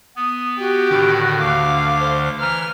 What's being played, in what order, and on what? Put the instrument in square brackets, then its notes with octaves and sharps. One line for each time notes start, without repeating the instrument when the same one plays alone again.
[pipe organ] B3 [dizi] D#6
[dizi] F#4 [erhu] G4
[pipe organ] A2 D#3 [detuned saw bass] D3
[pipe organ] D2 D6 [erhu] F5
[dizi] C5
[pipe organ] E3 [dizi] A#5 [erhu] F6